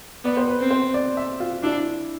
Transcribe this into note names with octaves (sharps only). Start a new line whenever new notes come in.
B3 D5
C5
B4
C4
C5
D5
E5
F4
D4 E4